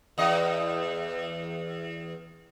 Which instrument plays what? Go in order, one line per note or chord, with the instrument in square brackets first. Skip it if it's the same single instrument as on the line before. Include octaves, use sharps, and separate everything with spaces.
[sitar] E2 D#5